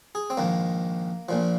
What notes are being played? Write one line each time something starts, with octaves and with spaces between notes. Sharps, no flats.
G#4
C4
A#1 G#2 D#3 A#3
A#1 A#2 F3